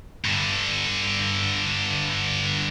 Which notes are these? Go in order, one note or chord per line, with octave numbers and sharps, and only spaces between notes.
G2 D3